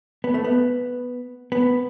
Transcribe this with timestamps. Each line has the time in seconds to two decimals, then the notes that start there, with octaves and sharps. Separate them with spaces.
0.24 B3
0.34 A3
0.44 B3
1.52 B3